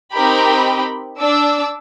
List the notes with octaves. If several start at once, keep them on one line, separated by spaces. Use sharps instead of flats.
C4 D#4 G4 A#4 G5 B5
D4 D6 E6